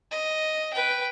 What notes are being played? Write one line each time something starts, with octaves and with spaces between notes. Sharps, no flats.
D#5
B4 G5